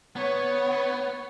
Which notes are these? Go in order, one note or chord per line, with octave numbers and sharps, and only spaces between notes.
B3 C#5